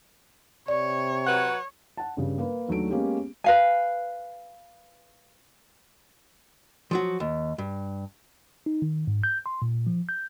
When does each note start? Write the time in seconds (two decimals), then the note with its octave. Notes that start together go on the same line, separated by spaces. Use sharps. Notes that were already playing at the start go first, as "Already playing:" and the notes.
0.68 C3 C#5 D5
1.26 F#3 B4 F#5
1.97 F#5 A5
2.17 G2 C#3 G3
2.38 A#3 B4
2.68 D#2 F#3 A3 D4 D7
2.90 G#3 A#3 B3 C#4 G4 G#4
3.44 B4 F5 G#5
6.91 F3 F#3 F#4
7.20 D#2
7.58 G2
8.66 D#4
8.82 D#3
9.07 G#2
9.24 G6
9.46 C6
9.62 A#2
9.87 F3
10.09 G6